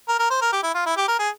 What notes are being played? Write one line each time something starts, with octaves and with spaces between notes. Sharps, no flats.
A#4
A#4
C5
A#4
G4
E4
F4
E4
G4
A#4
G#4